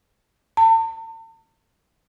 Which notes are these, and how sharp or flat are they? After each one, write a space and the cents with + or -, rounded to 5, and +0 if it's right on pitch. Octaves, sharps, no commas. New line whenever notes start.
A5 +45